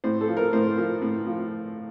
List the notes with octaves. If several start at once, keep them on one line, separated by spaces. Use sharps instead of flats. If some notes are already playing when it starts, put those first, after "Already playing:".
A2 C5
A4
F3
A#4
A2 C5
F3
A2
F3